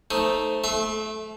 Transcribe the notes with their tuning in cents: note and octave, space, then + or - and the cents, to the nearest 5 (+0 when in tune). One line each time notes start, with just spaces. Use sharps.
A3 +0 D#4 +10 C5 +5
A3 -25 E5 +0 C6 +35